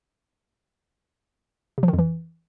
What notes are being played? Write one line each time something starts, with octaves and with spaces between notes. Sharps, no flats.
C3
F3
D#3
F2
E3